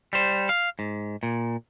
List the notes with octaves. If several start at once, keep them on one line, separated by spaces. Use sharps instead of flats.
G3 C5
F5
G#2
A#2